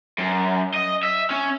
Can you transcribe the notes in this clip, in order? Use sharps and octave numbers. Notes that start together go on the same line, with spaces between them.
F#2
D#5
E5
C#4